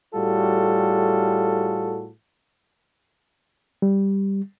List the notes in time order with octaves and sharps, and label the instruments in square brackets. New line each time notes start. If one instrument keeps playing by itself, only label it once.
[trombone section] A2 G3 F4 F#4 G#4 A4
[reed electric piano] G3